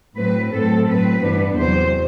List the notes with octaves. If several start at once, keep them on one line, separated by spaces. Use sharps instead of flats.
A2 F#3 C4 B4
A2 F#3 C4 A4
A2 F#3 C4 B4
G2 E3 B3 D4
E2 C3 F#3 C5